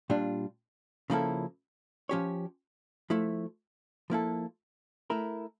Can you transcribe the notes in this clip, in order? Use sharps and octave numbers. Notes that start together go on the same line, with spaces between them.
A#2 G3 D4 F4
C#3 F3 A#3 E4 A4
F3 C#4 G4 C#5
F3 A3 E4
F3 A#3 E4 A4
A3 E4 A#4